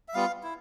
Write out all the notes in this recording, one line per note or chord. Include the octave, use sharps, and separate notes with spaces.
E5
G3 B3 F4 F5
E4